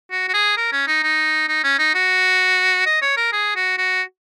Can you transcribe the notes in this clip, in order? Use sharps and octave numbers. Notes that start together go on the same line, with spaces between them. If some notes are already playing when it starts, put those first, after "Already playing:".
F#4
F#4
G#4
A#4
C#4
D#4
D#4
D#4
C#4
D#4
F#4
D#5
C#5
A#4
G#4
F#4
F#4